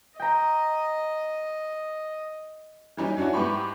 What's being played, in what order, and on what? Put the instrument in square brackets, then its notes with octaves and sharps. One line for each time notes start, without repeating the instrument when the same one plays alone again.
[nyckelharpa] D#5 [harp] G5 A#5
[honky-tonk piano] E3 F#3 G3 C#4 D#4
F#3 C#4 D4 E4 F#4
G#2 B3 E4 G4 B5 C#6